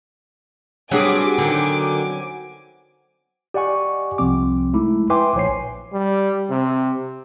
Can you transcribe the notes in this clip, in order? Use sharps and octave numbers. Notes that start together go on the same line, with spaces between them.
F#3 G3 B3 C4 D4 G#4 G#5 D6
D3 D#3
G4 D5 D#5 F#5 G#5 C#6
C2 C3 F3 C4 D6
G#3 A3 D#4 E4
B4 E5 G5 G#5 C6 D6
A#1 C5 C#5 G#5 C7
G3
C3